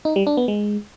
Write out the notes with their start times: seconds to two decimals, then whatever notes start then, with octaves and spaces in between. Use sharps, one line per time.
0.05 D#4
0.16 G3
0.27 D4
0.37 B3
0.48 G#3